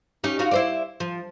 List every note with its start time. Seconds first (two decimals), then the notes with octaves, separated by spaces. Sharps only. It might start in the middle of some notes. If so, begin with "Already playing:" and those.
0.24 C#4 D#4 G4
0.39 D#4 F4 F#4
0.51 E4 C5 D5
1.00 F3